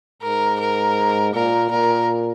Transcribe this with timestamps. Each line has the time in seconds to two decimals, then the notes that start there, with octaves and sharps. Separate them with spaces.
0.22 G#2 A#4
0.60 A#4
1.34 A#2 A#4
1.71 A#2 A#4